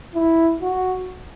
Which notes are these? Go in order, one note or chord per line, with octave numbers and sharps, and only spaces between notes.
E4
F#4